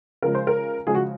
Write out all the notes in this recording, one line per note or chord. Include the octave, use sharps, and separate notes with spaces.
C#3 F3 G#3 A#4
C5
A#4
C#3 F3 G#3 G#4
F#4